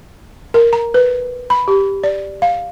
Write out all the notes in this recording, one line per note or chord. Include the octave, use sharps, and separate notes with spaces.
A#4
A#5
B4
B5
G4
D5
F5